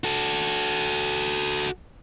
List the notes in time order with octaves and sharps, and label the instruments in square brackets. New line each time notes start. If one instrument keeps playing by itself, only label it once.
[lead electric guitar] F#4 A4